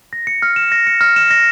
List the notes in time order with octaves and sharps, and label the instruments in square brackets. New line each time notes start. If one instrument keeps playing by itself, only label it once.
[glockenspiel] A#6
C#7
F6
E7
A#6
C#7
F6
E7
A#6